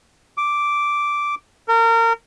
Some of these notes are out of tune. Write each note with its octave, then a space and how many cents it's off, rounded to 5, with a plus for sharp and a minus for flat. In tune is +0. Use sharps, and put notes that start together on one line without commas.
D6 -5
A#4 -30